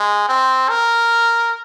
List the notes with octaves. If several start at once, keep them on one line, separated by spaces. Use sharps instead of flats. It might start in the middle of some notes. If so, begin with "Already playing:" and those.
Already playing: G#3
C4
A#4